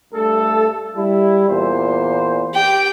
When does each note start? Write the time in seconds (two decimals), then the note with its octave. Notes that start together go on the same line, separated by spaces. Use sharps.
0.14 G2 A3 A4
0.97 G3 E4
1.49 E2 A#2 C5
2.55 G4 G5